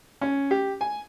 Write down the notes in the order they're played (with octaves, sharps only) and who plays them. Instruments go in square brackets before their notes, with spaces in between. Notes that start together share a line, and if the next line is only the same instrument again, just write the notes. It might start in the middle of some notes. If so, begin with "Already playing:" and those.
[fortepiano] C#4
G4
G#5